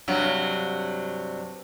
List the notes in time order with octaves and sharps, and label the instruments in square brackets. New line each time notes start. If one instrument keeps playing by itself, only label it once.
[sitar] G2 C3 F#3